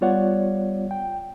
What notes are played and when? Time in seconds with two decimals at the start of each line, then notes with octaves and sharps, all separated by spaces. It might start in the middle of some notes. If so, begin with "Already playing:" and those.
0.01 G3 B3 F4 C#5 D5 F#5
0.91 G5